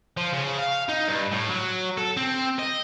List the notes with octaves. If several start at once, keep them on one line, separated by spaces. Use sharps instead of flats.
F3
C#3
F5
D#4
G2
A2
F#3
A4
C4
D#5